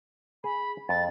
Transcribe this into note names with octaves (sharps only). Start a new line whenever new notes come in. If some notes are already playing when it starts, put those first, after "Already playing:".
G#4 B5
F2 A6